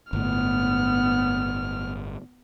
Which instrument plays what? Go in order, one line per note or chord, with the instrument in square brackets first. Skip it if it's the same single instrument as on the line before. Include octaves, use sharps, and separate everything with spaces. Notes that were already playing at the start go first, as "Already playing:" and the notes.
[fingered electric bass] G1 A2 [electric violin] B3 F6